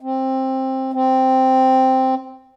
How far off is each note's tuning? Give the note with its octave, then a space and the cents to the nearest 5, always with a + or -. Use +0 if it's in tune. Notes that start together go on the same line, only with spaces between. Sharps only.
C4 +15
C4 +0